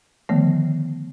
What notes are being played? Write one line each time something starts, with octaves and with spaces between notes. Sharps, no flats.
D3 D#3 F3 A3 B3